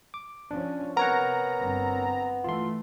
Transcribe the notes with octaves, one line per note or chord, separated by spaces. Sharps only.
D6
F3 C#4 D4
C3 B3 A#4 C#5 F#5 A#5
G1 C4
E3 A3 F4 C6